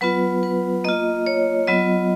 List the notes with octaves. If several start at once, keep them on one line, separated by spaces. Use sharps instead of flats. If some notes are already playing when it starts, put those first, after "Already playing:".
F#3 B3 F4 B4
B4
A#3 F4 D#5
C#5
F#3 B3 F4 D#5